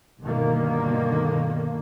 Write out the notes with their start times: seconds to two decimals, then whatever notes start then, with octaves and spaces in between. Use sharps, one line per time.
0.21 G1 B2 D3 D#3 A#3